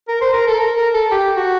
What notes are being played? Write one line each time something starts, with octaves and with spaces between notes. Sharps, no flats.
A#4
C5
A#4
A4
A#4
A#4
A4
G4
F#4